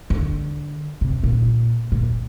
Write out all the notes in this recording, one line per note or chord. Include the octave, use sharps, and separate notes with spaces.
D3
C3
A#2
A#2